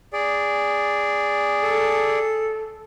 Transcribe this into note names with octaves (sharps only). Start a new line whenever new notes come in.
G#4 D5
A4